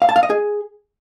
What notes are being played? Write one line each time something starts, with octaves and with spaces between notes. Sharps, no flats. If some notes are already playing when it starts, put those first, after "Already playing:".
F5
A5
F5
D#5
G#4